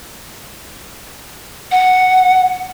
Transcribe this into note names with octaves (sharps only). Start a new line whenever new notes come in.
F#5